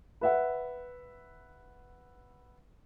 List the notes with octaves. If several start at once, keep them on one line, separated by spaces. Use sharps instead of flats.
B4 E5 F#5